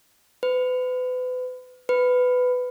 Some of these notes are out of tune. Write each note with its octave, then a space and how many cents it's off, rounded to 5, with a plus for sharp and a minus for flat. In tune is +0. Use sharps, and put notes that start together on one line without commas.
B4 +35
B4 +15